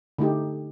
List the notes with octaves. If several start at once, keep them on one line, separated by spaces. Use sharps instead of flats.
D3 A3 D#4 G4